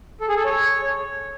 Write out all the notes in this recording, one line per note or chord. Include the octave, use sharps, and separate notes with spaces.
A4
G#4
A4
C#5